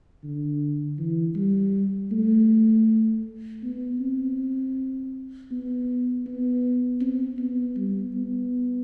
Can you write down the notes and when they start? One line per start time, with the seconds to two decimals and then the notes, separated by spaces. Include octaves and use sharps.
0.23 D3
0.99 E3
1.36 G3
2.12 A3
3.63 B3
4.00 C4
5.51 B3
6.27 B3
7.01 C4
7.39 B3
7.77 G3
8.15 B3